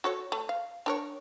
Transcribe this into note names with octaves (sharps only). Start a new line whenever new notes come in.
F#4 A4 C#5
A3
F5
D4 A#4 C#5